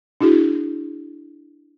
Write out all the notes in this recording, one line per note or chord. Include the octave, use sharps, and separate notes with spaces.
D4 E4 F#4 G#4